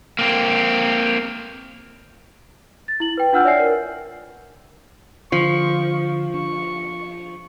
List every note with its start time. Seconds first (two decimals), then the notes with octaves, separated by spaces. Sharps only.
0.19 A#3 C4
2.88 A6
3.00 E4 F#7
3.17 B4 G5
3.33 D4 F4 F#5 E6 F6 G6
3.44 C#5 D5 E5 G#5 C7
3.59 A#4
5.32 D3 F3 C#6
6.34 D4 C#6